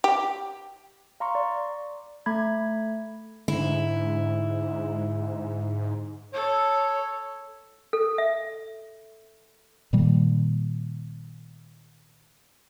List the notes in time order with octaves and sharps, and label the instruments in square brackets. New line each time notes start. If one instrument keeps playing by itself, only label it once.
[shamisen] G4
[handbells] F5 A#5 C6 C#6
D5
A3 B5 G#6
[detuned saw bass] G#2 [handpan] D3 [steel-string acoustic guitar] E4
[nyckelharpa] A4 [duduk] C#5
[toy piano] A4
E5
[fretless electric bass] A#2 D#3 G3 A#3